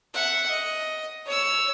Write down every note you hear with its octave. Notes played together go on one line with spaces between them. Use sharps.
E5 F#5
D#5
C#5 E6